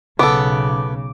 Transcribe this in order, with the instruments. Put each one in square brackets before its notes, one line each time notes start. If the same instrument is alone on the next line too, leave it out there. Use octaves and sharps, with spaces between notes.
[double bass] B1 C#3 [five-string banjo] B3 A4 [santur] D6